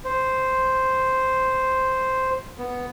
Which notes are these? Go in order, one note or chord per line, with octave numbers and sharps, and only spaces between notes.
C5
B3